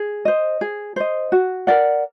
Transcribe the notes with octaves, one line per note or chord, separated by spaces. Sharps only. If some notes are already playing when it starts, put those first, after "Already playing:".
Already playing: G#4
C5 D#5
G#4
C5 D#5
F#4
A#4 D5 F#5